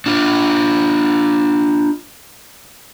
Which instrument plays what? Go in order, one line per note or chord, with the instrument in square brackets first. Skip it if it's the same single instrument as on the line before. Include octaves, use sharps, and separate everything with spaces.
[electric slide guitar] D4 F4